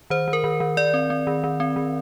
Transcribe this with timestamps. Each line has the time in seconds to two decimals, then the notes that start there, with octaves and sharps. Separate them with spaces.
0.10 D#3 C5
0.28 D#3
0.33 A#4
0.44 D#3
0.60 D#3
0.77 D#3 D5
0.94 C4
1.10 C4
1.27 D#3
1.44 D#3
1.60 C4
1.76 D#3